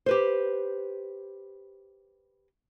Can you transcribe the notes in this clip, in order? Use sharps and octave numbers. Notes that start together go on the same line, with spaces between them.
G4 B4 C5